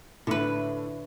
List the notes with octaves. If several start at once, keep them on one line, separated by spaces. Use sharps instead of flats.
A2 D3 B4